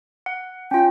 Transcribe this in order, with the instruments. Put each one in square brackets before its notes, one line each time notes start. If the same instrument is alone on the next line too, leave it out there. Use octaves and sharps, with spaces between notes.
[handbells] F#5
[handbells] C#4 F4 [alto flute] G5